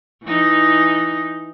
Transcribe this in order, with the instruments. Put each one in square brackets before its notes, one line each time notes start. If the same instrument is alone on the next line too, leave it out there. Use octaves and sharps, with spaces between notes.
[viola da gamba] E3 D#4